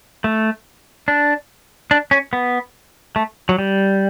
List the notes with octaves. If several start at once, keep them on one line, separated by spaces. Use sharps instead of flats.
A3
D4
D4
C#4
B3
A3
F#3
G3